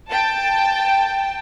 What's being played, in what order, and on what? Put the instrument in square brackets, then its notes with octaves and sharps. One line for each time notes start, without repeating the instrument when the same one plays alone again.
[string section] G5 A5